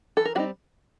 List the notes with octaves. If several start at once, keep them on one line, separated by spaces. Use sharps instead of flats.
E3 A4
A#4
G3 C4 D#4 F#4